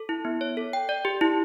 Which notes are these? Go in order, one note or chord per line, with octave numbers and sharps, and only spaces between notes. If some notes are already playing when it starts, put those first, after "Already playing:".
Already playing: A4
E4
B3
C#5
A4
G5
D5
G4
E4